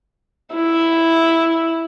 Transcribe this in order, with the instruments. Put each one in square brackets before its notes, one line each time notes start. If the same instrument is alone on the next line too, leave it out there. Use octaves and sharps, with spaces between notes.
[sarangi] E4